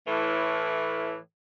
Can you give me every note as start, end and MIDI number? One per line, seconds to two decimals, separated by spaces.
0.07 1.15 45
0.07 1.15 52